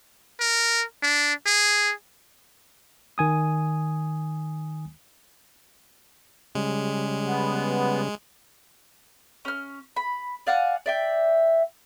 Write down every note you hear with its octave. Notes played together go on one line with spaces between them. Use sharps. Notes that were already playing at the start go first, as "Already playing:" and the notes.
A#4
D4
G#4
D#3 G#5 D#6
C#3 G3 G#3
B3
C#4 F6
B5
D5 F5 F#5 G#5
D5 E5 G5